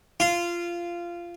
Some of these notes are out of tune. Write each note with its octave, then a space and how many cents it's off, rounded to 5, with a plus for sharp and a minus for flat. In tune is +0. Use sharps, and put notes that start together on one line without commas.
F4 -15